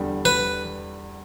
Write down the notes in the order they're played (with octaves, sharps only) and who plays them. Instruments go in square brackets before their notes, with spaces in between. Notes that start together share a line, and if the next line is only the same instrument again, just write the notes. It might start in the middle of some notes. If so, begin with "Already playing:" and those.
Already playing: [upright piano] E2 D3 G3 D4 G4
[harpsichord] B4